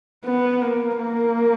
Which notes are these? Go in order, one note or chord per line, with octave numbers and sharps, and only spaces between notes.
B3
A#3
A#3